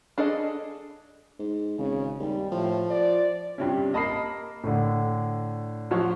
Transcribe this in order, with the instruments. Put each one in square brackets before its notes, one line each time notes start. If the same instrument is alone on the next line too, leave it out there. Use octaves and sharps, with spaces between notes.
[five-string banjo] D4 G#4 A4 D#5
[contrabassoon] G#2
[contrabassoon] G#1 [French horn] C#3
[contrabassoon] D#2 [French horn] G3
[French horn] A2 [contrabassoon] F3
[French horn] D5
[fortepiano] G2 C3 C#4
[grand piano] A#3 A#4 C7 [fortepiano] D#5 A5 B5
[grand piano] A2 D3
[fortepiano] F3 F#3 C#5